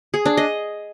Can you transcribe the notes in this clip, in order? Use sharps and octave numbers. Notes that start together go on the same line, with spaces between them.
G#4
D4
D#5